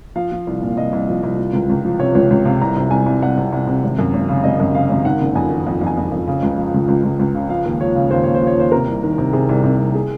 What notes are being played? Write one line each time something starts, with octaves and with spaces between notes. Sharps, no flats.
F3 F5
F3
C2
A#2
C2 D#5
C2
F3
C2
F3
C#2
C#2
F3
C3 C#5
C#2 C#5
C#2
C3 F5
C2 A#5
C3
C2 G#5
C2
C2 F#5
C3
C2
C3
G#1
F#2
G#1
C#3
G#1 D#5
F#2
C#3 F5
G#1
D#3 F#5
F#1
F2 G#5
D#3
F2
F2
G#5
F2
F2
C#3
C#2
F3
C#2
C#2
C#2
C#2
C#3
F3 F5
D#2
F3 C#5
C#3
D#2 C5
D#2 C#5
C5
F3
C#5
D#2 C5
C3 A#4
C2
D#3
C3
C3 G#4
C2
C3
C2
G#4